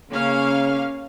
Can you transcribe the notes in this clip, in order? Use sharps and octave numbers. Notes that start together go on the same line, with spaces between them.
C#3 A#3 C#4 F5